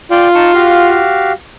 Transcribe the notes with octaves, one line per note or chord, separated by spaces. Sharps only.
F4 D5 G5
D#4 A5 C#6
F#4 G4 F5